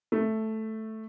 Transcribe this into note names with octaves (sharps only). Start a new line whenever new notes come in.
A3